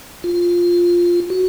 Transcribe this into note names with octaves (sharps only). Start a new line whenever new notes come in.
F4
F#4